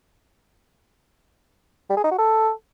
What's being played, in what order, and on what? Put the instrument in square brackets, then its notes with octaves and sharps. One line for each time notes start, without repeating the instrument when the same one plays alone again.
[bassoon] G3
G#4
D#4
F#4
A4